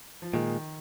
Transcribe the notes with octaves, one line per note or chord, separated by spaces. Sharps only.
F3
A#2 D#3 G#3